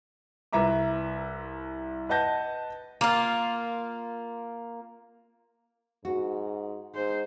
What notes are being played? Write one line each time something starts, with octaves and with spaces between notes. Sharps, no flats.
C2 B4 E5 A#5 D6
B4 D#5 F#5 A5 G6 A#6
A#3 F4
G#2 F#4
G#2 C5